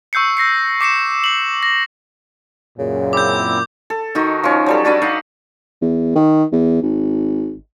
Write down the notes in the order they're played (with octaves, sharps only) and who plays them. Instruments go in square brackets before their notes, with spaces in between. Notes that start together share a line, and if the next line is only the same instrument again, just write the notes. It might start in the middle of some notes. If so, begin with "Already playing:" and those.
[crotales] C#6 E6 G6 C7 C#7
E6 A#6 C7 C#7
D6 C7 C#7 E7
C7 F#7
A#6
[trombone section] F#2 A#2 [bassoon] C#3
[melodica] C4 E4 [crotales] D6 G6
[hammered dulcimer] A4
D#3 D#4 F#4
F3 C#4
F#3 G3 A4
D4 F#4 B4 D5
D#4 F5 F#5
[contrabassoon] E2
D#3
E2
G#1